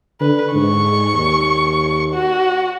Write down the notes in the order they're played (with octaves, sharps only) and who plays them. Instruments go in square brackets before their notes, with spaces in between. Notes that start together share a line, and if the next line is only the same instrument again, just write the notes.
[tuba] D3 [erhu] B4
[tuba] G#2 [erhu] C#6
[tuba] D#2
[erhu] F#4